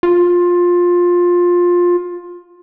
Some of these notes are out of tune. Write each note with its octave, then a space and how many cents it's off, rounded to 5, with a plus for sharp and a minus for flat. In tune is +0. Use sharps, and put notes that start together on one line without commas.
F4 +15